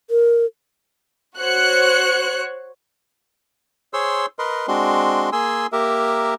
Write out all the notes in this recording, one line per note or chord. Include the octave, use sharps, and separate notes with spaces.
A#4
F#4 C5 C#5 F#6 C#7
G#4 C5 C#5 C6 E6
A#4 B4 D#5 C6
G#3 C4 D4 F#4 C6
A#3 G#4 G#5 C6 E6
A#3 G4 A#4 E5